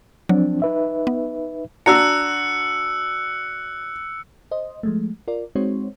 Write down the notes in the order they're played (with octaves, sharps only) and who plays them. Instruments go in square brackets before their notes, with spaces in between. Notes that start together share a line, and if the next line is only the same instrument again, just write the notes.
[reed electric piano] F3 C4 D4 [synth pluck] F#3
[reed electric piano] D#4 B4 E5
[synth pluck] B3
[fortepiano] D4 F#4 A#5 [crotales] E6 F#6 C#7
[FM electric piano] C5 D#5
F3 G#3 A3
F4 A#4 D5
G#3 C4 D#4 F#4 C5 C#5